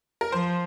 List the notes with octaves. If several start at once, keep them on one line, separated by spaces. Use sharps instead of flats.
A#4
F3 C5